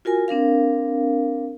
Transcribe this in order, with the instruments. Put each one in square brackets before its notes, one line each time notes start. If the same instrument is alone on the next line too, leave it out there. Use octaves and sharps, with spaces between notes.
[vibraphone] F4 F#4 A#4 G#5
C4 D4 A#4 F5